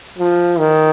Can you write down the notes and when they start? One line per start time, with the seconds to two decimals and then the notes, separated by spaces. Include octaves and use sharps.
0.18 F3
0.59 D#3